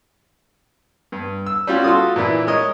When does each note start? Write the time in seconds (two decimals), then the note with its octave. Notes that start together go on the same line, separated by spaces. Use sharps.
1.12 G2
1.46 E6
1.67 G3 C#4 F4 F#4
1.84 F4 F#4 A4 C6 D#6
2.16 A#2 E3 A#3 D4 E4
2.47 G#3 A#4 C#5 D#5